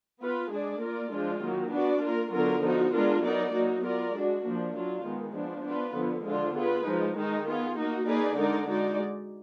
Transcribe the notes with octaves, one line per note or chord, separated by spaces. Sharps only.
B3 F4 B4
G#3 D4 G#4 D5
A#3 F4 A#4 D5
F3 G#3 D4 F4
D#3 F#3 A#3
B3 D4 F#4 D5
A#3 F4 A#4
D3 F#3 B3 F4 A#4
F3 B3 D#4 F#4
G#3 B3 D4 F4 A#4
F#3 B3 D#4 A#4 D5
F#3 A#3 D#4 F#4
B3 F4 A#4 D5
G#3 D4 F#4
F3 A#3 D4
F#3 D4 F4
D#3 G#3 B3
F3 B3 D4
B3 D4 F4 B4
D3 F3 B3
D3 F3 G#3 D4 F4
B3 F4 G#4 B4
F3 G#3 D#4
D#3 G#3 D#4
B3 F4 G#4
A#3 D#4 F#4
A#3 D#4 G#4 B4 D5
D3 G#3 D#4 A#4 D5
G#3 D#4 F#4 D5